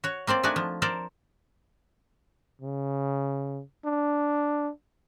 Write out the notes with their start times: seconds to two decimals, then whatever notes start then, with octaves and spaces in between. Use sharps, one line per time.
0.04 F#4 C#5
0.27 A#3 C4 C5 D5
0.43 A3 D4 D#4 F#4 D5 G#5
0.56 F3
0.82 A4 A#4 C5 D5
2.62 C#3
3.85 D4